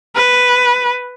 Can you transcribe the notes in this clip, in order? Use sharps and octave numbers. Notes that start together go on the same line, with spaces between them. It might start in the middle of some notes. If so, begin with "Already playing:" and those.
B4